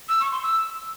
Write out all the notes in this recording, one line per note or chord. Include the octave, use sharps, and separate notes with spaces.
E6
C#6
C6
E6